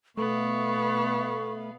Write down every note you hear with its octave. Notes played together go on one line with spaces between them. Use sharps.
B2 A3 B3 F5 C#6